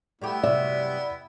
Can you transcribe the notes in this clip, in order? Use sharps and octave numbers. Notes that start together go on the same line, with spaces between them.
G3 A3 B3 E4 G4
G2 C3 F#3 D5 E5